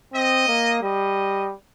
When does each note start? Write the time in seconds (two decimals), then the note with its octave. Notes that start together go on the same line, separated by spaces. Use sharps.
0.14 C4 D#5
0.48 A#3
0.83 G3 D#5